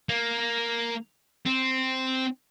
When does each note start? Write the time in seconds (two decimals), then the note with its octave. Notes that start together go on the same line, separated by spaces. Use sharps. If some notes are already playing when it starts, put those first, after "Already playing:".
0.09 A#3
1.46 C4